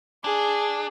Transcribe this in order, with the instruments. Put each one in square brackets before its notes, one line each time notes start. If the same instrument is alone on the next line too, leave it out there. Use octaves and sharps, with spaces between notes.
[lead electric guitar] D4 [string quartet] G#4